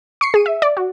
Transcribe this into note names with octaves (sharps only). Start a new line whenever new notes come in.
C#6 C7 C#7
G#4 D#7
E5
D5
F#4